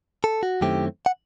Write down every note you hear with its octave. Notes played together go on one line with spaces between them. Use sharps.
A4
F#4
F#2 D#3 A3 C4 E4 G4
F#5